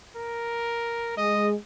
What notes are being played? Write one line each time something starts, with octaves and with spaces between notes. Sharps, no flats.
A#4
G#3 D#5